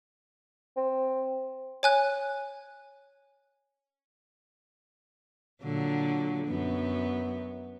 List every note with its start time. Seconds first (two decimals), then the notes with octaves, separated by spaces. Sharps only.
0.76 C4
1.83 C#5 G#5 F#6
5.63 A#2 D3 F#3
6.47 F#2 B3